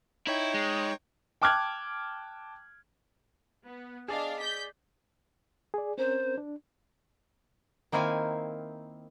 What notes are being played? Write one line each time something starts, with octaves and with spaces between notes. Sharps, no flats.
D#4 E4 C#5 G5
G#3
G5 A5 D6 F6 F#6 G#6
B3
D4 G#4 D5 D#5 F5
G6 B6
G#4 D5
C4 C#4 A#4 C5
D4
D#3 A#3 C4 E4 F5 G#5